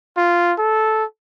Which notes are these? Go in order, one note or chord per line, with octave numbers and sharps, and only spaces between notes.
F4
A4